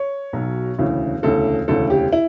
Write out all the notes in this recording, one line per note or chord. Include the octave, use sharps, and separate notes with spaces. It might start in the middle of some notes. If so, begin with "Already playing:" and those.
Already playing: C#5
B1 B2 F#3
E1 D2 C#3 E3
E1 D2 C#3 E3 A4
E1 D2 C#3 E3 A4
G4
E4